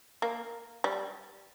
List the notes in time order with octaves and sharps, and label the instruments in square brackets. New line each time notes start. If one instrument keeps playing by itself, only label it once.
[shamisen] A#3
G3